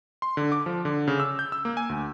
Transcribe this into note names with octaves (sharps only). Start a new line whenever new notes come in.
C6
D3
D6
F3
D3
C#3
E6
G6
E6
A#3
G#5
D2